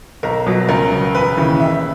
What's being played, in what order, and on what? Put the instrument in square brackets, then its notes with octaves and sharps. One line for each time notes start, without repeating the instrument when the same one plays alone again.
[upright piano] B1 A#4
B2 F#3
C#2 A#4
C#3 F#3
E1 B4
D#2 C#3 E3
F#1 E5